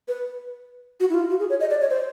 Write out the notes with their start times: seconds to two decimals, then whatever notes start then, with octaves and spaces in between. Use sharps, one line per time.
0.08 B4
1.00 F#4
1.10 E4
1.14 F4
1.30 F#4
1.40 G#4
1.50 C#5
1.60 D#5
1.70 D5
1.81 C#5
1.90 C5